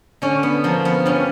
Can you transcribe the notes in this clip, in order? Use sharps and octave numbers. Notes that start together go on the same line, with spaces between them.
D3 C#4
B3
F3 A#3
B3
G2 C#4